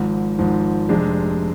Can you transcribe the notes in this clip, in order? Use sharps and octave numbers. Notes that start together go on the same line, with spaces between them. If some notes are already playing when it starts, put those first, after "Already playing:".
Already playing: G#1 G#2 F3
G#1 G#2 F3
F1 F2 C3 G#3 D4